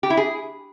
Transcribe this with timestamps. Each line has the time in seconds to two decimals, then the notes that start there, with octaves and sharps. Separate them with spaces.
0.03 G4
0.10 E4
0.17 G#4